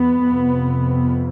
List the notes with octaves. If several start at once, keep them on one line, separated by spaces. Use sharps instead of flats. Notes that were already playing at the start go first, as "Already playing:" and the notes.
Already playing: E2 B3
F2 C3